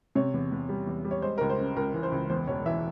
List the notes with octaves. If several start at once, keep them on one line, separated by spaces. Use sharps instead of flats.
C3 C#5
E2
E2
G3
E2
G3
C#5
G#3 C5
C#2 A#4
C5
C#3
C#2 A#4
E3
C5
C#2
E2 C5
E1 C#5
E3 E5